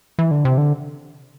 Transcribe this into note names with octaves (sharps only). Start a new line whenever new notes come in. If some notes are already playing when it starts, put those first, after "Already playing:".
E3
D3
C3
D3